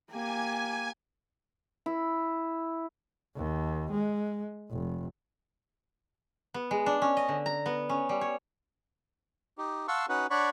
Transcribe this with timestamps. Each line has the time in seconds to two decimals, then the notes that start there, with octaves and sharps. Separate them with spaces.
0.11 A#3 G4 G#5
1.86 E4
3.36 D#2
3.91 G#3
4.71 F1
6.54 B3
6.71 G#3
6.86 D4
7.02 C#4
7.17 D#5
7.29 D3
7.46 A#5
7.66 B3
7.89 C#4
8.09 G3
8.21 C#5
9.58 D#4 G4
9.88 F5 F#5 A5 C6 C#6 E6
10.09 C#4 D#4 F#4 B4 F#5
10.30 D4 C#5 D5 F#5 B5 C#6